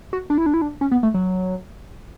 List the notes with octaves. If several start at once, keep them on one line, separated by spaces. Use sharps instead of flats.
F#4
D4
E4
D4
E4
D4
C#4
B3
A3
F#3